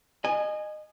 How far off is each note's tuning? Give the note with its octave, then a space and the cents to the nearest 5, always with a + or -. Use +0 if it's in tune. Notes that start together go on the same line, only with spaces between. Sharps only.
D#5 -25 G#5 +0